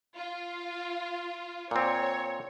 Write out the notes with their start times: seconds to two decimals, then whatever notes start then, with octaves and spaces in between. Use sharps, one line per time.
0.16 F4
1.71 A#2 C4 C#5